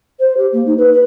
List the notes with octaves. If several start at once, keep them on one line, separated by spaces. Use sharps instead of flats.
C5
G4
A#3
D#4
B4
B4